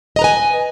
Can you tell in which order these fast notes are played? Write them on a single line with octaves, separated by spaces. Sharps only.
D#5 A#5 B4 G#5